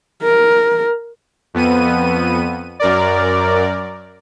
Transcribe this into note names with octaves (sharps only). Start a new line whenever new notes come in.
A#4
F2 B3 D#7
F#2 A#4 D5